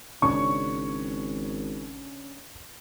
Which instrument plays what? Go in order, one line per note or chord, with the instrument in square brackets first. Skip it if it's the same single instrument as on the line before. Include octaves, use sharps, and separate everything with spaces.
[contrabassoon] G#1 [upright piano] C#3 C#4 D4 [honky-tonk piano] C#6